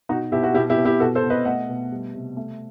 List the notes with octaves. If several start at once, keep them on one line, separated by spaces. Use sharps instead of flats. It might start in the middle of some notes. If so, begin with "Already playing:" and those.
B2 D#4 F#4
B2 E4 G4
F#4
B2 E4 G4
E4 G4
B2
E4 G4
B2 F#4 A4
A4 C5
B2
B4 D#5
A3 D#5 F#5
B2
G3
C3
A3